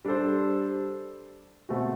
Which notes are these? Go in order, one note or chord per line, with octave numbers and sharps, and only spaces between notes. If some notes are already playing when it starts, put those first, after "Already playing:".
G3 D4 A4 C5
B2 A3 C4 F#4